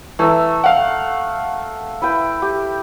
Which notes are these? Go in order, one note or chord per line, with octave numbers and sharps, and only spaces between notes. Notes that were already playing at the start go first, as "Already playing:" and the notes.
E3 A3 E5 A#5
F5 F#5
E4 B4 G5
G4